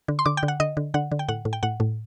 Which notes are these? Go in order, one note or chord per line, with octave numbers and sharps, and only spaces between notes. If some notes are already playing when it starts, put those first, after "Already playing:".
D3
C6
D3 D6
G5
D3
F#5
D3 D#5
D3
D3 F#5
D3
G5
A2 F#5
A2
G5
A2 F#5
A2